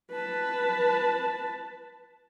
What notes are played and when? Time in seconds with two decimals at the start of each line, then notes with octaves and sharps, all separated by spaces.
0.11 B4 A5